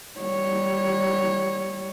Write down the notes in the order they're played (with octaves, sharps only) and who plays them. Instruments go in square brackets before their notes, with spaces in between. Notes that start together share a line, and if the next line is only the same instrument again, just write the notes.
[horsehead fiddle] G3 C#5